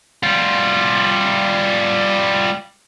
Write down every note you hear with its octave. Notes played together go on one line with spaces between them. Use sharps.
G3 F4